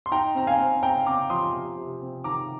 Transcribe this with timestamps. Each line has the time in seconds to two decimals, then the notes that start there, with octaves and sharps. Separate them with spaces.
0.06 C6
0.11 D#4 G5 A#5
0.35 C4 A#5
0.47 F5 G#5
0.59 C4
0.83 C4 G5 A#5
1.06 C4 A#5 D6
1.30 F3 C6 D#6
1.54 C3
1.77 C3
2.01 C4
2.24 D#3 A#5 D6